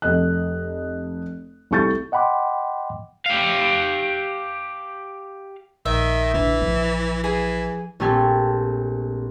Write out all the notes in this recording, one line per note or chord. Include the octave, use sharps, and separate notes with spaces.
F1 A4 D#5 F#6
C2 A3 E4 C#6 G6 A6
D#5 F#5 G5 B5 C6 D6
G4 F5
A#1 D#3 E5
D3 E3 D4
F3
E3 G#4
A#1 A3 C4 G4 A4 G#5